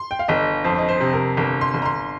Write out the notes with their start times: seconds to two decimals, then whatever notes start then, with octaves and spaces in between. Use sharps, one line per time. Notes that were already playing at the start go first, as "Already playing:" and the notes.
Already playing: C6
0.11 G5
0.19 F5
0.28 G1 D#5
0.64 F2 C5
0.78 D#5
0.89 C5
1.00 C3
1.13 A#4
1.37 G1 A#4
1.61 C6
1.74 G1
1.82 A#5
1.85 C6